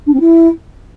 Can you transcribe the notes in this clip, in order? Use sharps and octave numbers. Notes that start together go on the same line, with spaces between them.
D4
C4
E4